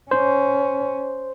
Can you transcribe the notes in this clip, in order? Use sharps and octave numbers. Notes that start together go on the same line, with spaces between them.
C#4 C5